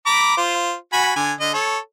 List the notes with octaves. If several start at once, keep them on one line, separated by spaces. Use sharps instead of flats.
A#5 B5 D6
F4 C5
F#4 G#5 B5
D3 G#5
D3 D#5
A4 C#5